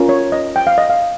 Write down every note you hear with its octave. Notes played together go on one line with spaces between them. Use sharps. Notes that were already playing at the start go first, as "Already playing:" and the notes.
Already playing: C#4 F4 A#4
C#5
D#5
G5
F5
D#5
F5